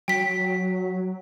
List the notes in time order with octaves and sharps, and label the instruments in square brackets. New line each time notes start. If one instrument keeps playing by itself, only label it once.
[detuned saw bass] F#3 [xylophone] G5 B6